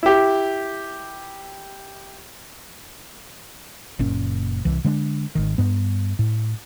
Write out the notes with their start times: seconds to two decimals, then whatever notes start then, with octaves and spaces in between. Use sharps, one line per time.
0.03 E4 G4
3.99 F#1 A#2 C#4
4.65 C2 E3
4.85 D3 G#3 C#4 D4
5.35 G#1 D#3
5.58 G2 B3
6.19 A2